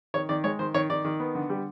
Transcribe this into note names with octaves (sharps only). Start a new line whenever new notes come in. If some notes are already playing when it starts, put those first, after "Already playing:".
D#3 C#5
D#3 D5
G#3 C#5
D#3 C5
D#3 C#5
D#3 D5
D#3
B3
D3
G3